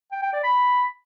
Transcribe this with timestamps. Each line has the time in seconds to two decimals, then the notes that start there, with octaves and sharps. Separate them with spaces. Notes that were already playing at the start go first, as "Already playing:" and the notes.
0.12 G5
0.22 G5
0.33 D5
0.44 B5